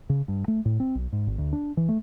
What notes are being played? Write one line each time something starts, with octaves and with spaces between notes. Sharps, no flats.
C#3
G2
A3
A2
C4
B1
G#2
G#1
D2
D4
E3
A3